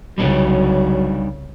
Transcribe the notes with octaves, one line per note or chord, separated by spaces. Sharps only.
C2 C#3 F#3 G3 D4 D#4